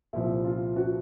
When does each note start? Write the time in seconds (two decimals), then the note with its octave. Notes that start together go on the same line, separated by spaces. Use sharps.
0.13 C2 A#2 F3 E4
0.45 F4
0.76 F#4